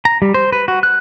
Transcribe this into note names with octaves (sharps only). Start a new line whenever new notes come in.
A#5
G3
C5
B4
F#4
F#6